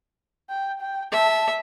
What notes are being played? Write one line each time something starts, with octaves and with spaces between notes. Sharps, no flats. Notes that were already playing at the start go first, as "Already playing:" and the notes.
G5
G5
E5 A5